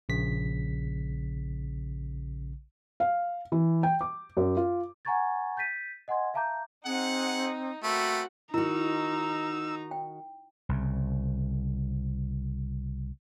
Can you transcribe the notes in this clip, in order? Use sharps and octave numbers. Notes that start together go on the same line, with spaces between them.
A#1 C#3 B6
F5
E3
G5
D6
F#2
F4
F#5 G#5 A#5 C#6 G#6 A6
G6 A6 B6 D#7
D#5 F#5 G#5 C6 G#6
E5 F5 A5 A#5 D6 G6
C4 D#4 G#4 F#5
A3 A#3 C4 F#4 B5
D#3 D#4 E4 F#4 A#5 E6
G5
C2 C#3